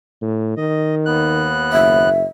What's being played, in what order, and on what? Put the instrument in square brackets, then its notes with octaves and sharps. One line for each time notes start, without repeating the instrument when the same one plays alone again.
[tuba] A2
[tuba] D#3 [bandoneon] D#5
[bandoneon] D#2 B3 F#6
[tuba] F#1 [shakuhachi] E5